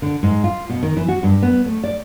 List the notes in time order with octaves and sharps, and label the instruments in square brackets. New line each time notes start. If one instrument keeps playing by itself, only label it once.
[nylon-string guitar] D3
G#2
F4
B2
D#3
E3
F#4
G2
B3
A3
D5